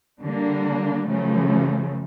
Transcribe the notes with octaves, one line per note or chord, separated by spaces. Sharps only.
D3 G3 A#3 D4
F#2 C#3 F3 A3